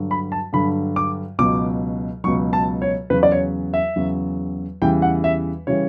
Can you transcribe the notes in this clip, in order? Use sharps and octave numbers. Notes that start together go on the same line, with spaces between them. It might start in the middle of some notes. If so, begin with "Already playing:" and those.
Already playing: G2 D3 F#3
B5
A5
G2 D3 F#3 B5
D6
C#2 B2 F#3 D6
C#2 B2 F#3 C#6
A5
C#5
E2 C#3 F#3 B4
D5
C#5
E5
E2 C#3 F#3
E2 C#3 E3 G3 G5
F#5
E5
C#3 E3 G3 C#5